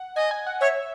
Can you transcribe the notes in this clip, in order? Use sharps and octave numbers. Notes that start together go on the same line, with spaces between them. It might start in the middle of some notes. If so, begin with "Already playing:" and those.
Already playing: F#5
D#5 G#5
G#5
F#5
C#5 E5